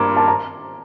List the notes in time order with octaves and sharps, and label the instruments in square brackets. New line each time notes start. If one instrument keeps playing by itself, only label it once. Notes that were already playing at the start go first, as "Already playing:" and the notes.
Already playing: [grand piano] G2 A#3 [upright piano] A#5 C6 D6
[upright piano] A5
A#5